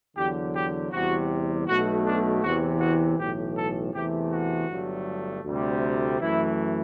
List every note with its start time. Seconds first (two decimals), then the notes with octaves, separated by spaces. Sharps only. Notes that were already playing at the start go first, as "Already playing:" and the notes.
0.16 E2 D3 F#3 G4
0.54 G4
0.92 E2 C3 G3 F#4
1.67 B1 B2 A3 F#4
2.05 D4
2.43 E2 C3 E3 F#4
2.80 F#4
3.18 B1 A2 E3 G4
3.56 A4
3.94 E2 C3 E3 A3 G4
4.32 F#4
4.69 G1 G2 F#3 A3
5.45 D2 C3 G3
6.20 F#2 E3 A3 E4